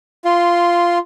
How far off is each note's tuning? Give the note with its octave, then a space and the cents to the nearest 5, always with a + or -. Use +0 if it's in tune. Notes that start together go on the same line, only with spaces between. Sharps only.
F4 -10 C6 +0